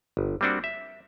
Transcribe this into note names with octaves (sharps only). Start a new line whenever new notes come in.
G1
G3 A#3 C4 D4 F#4
E5